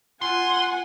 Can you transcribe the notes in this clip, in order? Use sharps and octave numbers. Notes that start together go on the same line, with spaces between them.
F4 F#5 G#5 C6